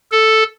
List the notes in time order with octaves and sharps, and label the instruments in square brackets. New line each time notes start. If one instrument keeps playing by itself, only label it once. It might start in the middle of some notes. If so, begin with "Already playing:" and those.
[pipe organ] A4